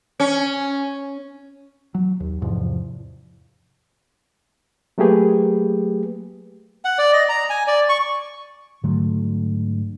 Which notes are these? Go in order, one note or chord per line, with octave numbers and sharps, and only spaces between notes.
C#4
F#3
D#2
E2 G#2 C3 F3
F#3 A3 A#3 G4 G#4 B4
F#5
D5
D#5
A#5
G#5
D5
C#6
G#2 D3 F#3 A3